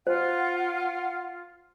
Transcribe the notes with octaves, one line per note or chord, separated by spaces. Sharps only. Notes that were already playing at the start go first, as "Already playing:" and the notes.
F4 C5 F#5